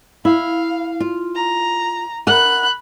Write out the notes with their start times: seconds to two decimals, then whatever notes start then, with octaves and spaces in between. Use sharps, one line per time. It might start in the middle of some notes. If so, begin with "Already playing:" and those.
0.25 E4 F5
1.00 F4
1.35 A#5
2.27 A#4 E5 F#5 B5 F#6